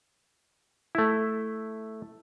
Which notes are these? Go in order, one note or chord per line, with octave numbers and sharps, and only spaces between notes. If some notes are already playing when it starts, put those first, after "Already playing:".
A3 E4